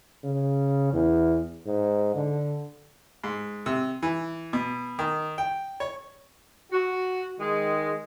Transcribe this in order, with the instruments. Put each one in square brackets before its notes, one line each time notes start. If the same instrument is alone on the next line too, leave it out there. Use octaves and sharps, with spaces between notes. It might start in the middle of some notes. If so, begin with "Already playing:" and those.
[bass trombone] C#3
E2
G#2
D3
[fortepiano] G#2
C3
E3
B2
D#3
G5
C#5
[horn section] F#4
D#3 G#3